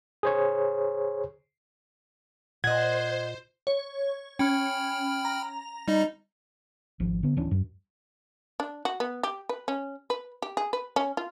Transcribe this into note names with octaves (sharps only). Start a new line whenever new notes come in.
G#4 C5 C#5
A#2 C5 D#5 F#5 G#6
C#5
C#4 G5 B5 F6
A#5
G3 D#4 D#5
G#1 F3
D3 B3
D1 E3 C#4 D4
F#2
D4
F#4
B3
G4
B4
C#4
B4
G4
G#4
B4
C#4
F4